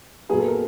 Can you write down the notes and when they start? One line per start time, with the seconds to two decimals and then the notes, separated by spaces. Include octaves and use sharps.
0.29 A#2 F#3 B3 G#4
0.38 A4
0.48 A#4